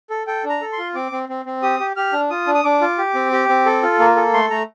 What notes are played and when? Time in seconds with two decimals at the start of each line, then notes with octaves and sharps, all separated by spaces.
0.10 A4
0.27 A4 G5
0.44 D4
0.50 A#5
0.61 A4
0.72 C6
0.78 F4
0.95 C4 D6
1.12 C4
1.29 C4
1.45 C4
1.63 G4 D#6
1.80 G4
1.96 G4 F6
2.13 D4
2.30 F4 D#6
2.47 D4
2.55 D#6
2.64 D4 D6
2.81 F4
2.98 G4
3.14 C4
3.32 G4
3.49 C4
3.66 A4
3.83 F4
3.99 A#3
4.16 A4
4.34 A3 C6
4.50 A3 A#5